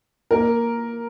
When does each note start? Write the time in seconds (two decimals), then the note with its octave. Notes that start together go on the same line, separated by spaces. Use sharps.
0.31 A#3 A#4